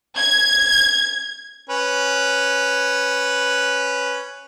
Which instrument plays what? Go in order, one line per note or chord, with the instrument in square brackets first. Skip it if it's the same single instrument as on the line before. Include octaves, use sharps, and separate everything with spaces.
[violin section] G#6
[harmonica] C#4 B4